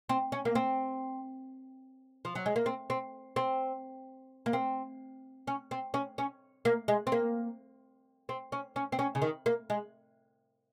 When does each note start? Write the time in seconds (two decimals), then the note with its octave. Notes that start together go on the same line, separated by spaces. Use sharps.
0.09 C4
0.32 C#4
0.45 A#3
0.55 C4
2.25 F3
2.35 F#3
2.46 G#3
2.56 A#3
2.66 C4
2.90 C4
3.36 C4
4.46 A#3
4.53 C4
5.47 C#4
5.71 C4
5.94 C#4
6.18 C#4
6.65 A#3
6.88 G#3
7.07 C4
7.12 A#3
8.29 C4
8.52 C#4
8.76 C#4
8.92 C4
8.99 C#4
9.15 C#3
9.22 D#3
9.46 A#3
9.70 G#3